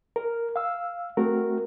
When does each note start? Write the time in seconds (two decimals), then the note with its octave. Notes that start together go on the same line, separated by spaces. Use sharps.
0.16 A#4
0.56 F5 E6
1.17 A3 C4 F#4 A#4